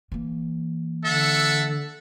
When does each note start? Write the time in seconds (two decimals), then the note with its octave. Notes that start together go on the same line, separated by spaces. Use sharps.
0.12 E3 A#3
1.05 D3 A4 E5 F#5